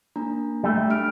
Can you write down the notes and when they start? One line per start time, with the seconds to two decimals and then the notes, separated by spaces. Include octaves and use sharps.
0.16 A#3 D4 A#5
0.63 G3 A3
0.90 D4 F6 D7